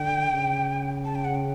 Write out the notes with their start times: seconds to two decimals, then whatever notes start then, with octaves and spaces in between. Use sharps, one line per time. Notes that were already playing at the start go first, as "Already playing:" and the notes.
Already playing: D3 G5
0.31 C#3
1.05 A5
1.15 G5
1.24 F#5
1.35 G5